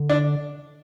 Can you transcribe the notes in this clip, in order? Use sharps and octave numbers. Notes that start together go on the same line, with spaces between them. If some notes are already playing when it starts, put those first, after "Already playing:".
Already playing: D3
D4